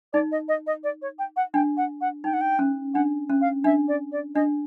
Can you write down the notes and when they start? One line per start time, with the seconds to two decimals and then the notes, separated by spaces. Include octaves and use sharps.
0.13 D#4 D5
0.32 D#5
0.48 D#5
0.67 D#5
0.84 D5
1.02 C#5
1.19 G5
1.36 F#5
1.54 D4 G5
1.77 F#5
2.01 F#5
2.24 D#4 G5
2.33 F#5
2.41 G5
2.59 C#4
2.94 D4 F#5
3.29 C#4
3.41 F5
3.64 D4 E5
3.88 D5
4.12 D5
4.35 D4 D#5